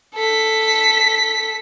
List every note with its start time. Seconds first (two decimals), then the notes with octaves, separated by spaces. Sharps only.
0.15 A4 B6